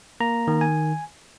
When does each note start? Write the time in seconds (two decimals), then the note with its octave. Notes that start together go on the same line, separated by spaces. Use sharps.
0.20 A#3 A#5
0.48 D#3
0.61 G#5